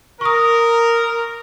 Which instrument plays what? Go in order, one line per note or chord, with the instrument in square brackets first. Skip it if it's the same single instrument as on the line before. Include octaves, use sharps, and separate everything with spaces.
[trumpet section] A#4 [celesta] C#6 D#6